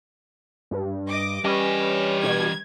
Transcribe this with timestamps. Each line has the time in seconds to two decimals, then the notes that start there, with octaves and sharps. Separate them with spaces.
0.71 G2
1.09 D#5 D6
1.44 E3 G3 C#4 B4 D#5
2.24 B2 G#6